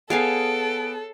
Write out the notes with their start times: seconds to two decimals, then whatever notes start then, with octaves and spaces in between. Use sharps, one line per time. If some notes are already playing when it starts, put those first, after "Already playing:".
0.10 B3 G#4 A4 C#5 F5 G#5 C7 D7